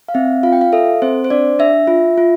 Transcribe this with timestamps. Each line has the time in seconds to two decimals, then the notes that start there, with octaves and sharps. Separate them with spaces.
0.08 F5
0.14 C4 E5
0.43 F4 F5
0.52 G5
0.61 F5
0.72 A4 E5
1.02 C4 C5
1.24 C5
1.30 D4 D5
1.59 D4 E5
1.87 F4
2.18 F4